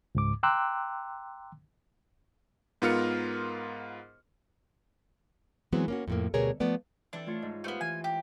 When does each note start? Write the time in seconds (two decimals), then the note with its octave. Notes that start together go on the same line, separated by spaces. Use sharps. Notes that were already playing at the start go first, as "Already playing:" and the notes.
0.15 C#2 G#2 D6
0.43 G5 A#5 C6 D6 E6 F#6
2.82 G#2 B3 F4 A#4 F6 C#7
5.73 E3 F#3 G#3 B3 C4
5.88 A#3 C#4 F#4
6.08 F2 A2 A#3
6.34 D2 B2 G3 G#4 A#4 C#5
6.60 F3 A3 B3 D5
7.13 E3 C4 D4 A4
7.26 A3 F4 C#5
7.42 G#2
7.64 A3 B3 G4 C5 F5
7.81 E3 G#5
8.04 G4